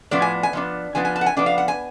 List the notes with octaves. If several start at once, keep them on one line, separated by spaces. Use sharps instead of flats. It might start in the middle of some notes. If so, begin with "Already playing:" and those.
A2 F3 B3 D4 D5
G#5
G#5
F3 B3 D4
F3 B3 D4 G#5
G#5
A5
F#5
G#5
F3 B3 D4 D5
F5
F#5
G#5